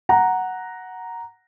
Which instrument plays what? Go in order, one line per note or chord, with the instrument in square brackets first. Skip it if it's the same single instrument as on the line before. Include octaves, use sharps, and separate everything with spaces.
[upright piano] F#5 A#5